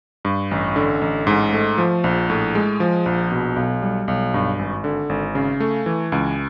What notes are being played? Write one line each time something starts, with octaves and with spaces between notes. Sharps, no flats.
G2
A1
D3
A1
G#2
A3
F3
A#1
A2
G#3
F3
A#1
B2
B1
G3
B1
G2
G#1
D3
G#1
C#3
A3
E3
C#2